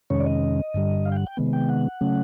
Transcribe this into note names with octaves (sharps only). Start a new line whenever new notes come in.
F2 C3 D#3 G#3 C#4 C#5
D5
D#5
G2 D3 G3
F5
G5
F#5
G5
C3 D#3 G#3 B3
G5
F#5
C#3 F#3 A3 C#4